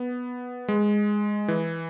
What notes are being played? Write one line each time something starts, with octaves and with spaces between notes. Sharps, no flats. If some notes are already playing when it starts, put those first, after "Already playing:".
Already playing: B3
G#3
E3